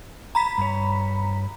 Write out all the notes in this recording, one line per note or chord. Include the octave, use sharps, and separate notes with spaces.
A#5 B5 B6
G2 C#5